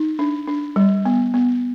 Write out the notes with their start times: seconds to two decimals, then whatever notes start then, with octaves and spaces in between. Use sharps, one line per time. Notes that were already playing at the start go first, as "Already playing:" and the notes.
Already playing: D#4
0.19 D4
0.47 D4
0.76 G3
1.05 B3
1.34 B3